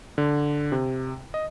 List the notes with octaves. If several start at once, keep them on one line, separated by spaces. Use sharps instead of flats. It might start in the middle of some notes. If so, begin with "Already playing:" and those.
D3
C3
D#5